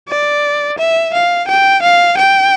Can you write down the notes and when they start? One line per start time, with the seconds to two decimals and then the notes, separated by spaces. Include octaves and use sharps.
0.08 D5
0.78 E5
1.13 F5
1.48 G5
1.82 F5
2.17 G5